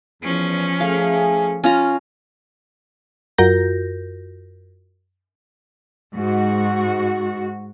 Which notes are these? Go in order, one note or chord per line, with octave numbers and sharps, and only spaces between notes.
E2 F3 C#4
A3 G#4 F5
C#4 F4 A#5
F#2 F4 F#4 A#4 G6 A#6
G#2 F#4